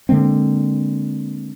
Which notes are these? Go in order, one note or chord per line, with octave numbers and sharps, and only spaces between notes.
D3 G#3 A#3 C4